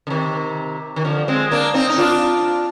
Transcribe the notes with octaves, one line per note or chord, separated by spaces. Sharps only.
D3
C3 D#3
D#3
D3 F3
G#3 C4
A#3 D4
C4 D#4
D#4
D4 F4